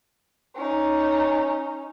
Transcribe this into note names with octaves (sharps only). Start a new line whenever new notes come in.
C#4 D#4